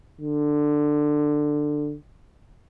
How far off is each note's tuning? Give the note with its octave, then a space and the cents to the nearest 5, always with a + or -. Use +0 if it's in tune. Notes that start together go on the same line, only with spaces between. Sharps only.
D3 +15